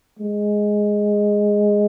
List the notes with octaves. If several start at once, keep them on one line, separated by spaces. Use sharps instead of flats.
G#3